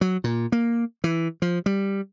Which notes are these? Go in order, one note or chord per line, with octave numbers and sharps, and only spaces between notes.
F#3
A#2
A#3
E3
F3
G3